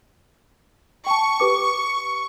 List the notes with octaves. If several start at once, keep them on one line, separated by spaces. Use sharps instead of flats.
G5 A5 C#6
G4 B4 D6